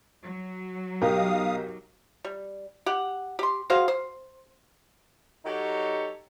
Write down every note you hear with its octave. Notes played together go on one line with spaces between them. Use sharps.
F#3
B1 G4 A#4 F5 D#6
G3
G4 F#5
G4 C6
F#4 G#4 C5 F5
C5
F#3 D#4 G4 A4 C#5